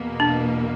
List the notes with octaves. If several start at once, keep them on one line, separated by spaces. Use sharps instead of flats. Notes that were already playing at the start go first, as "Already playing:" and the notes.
Already playing: E2 B2 A#3
D4